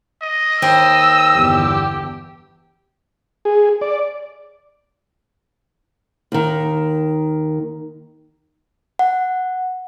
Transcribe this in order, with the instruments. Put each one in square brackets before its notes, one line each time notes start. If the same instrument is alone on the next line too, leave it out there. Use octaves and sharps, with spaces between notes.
[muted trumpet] D#5
[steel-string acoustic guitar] D#2 C5 G5 [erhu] E6
[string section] G1 E2 G4
[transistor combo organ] G#4
D5
[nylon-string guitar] D#2 D#3
[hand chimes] F#5